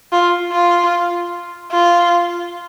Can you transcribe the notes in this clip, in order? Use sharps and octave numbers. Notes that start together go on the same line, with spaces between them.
F4
F4
F4